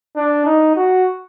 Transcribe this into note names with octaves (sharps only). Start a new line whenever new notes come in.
D4
D#4
F#4